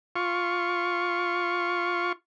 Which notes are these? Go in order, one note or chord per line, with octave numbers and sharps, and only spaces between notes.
F4 C#6